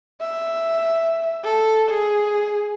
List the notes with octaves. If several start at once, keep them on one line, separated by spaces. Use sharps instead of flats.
E5
A4
G#4